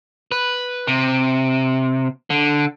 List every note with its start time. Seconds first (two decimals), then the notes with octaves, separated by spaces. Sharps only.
0.32 B4
0.87 C3
2.30 D3